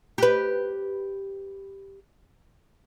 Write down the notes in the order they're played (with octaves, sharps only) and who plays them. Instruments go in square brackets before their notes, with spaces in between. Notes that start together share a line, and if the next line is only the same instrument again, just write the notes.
[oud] G4 B4